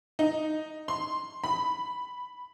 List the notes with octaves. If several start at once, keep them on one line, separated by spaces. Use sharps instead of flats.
D#4
C6
B5